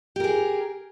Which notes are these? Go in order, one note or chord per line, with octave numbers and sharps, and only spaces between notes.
G4 G#4 A#4